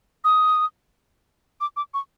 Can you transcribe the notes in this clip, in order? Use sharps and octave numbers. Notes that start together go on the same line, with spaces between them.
D#6
D6
D6
C#6